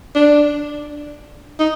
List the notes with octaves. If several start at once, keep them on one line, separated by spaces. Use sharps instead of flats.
D4
D#4